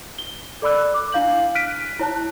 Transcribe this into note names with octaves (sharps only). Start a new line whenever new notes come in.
G7
A4 D5 B5 E6 F#6
D6
D4 E4 F5 G6 F#7
F6 F#6 B6 D7 D#7
E4 C#5 A5 F#6